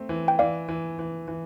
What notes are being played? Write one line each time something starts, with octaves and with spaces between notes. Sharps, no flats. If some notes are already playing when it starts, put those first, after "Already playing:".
Already playing: A3 C4
E3
G5
E3 D5 F5
E3
E3
E3